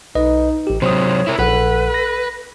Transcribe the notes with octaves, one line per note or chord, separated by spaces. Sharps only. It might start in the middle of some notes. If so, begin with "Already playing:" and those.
B1 D#4 B4 D#5
A1 G4
C3 F#3 C5 C#5 D#6
E4 A#4
A#1 A4 B4 F#5
A#6